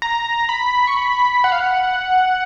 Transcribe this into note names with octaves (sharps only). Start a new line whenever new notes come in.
A#5
B5
C#6
B5
F#5
F5
F#5